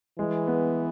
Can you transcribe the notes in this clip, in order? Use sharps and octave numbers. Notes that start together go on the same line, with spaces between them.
E3 G#3
B3